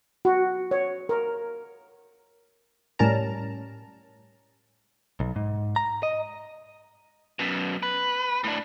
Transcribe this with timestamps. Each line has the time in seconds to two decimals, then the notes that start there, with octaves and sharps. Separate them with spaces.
0.25 F#4
0.71 C#5
1.09 A#4
2.99 A2 G3 C#4 A#4 A5 A#5
5.20 B1
5.36 G#2
5.76 A#5
6.03 D#5
7.39 F#2 B2
7.83 B4
8.44 A2 D4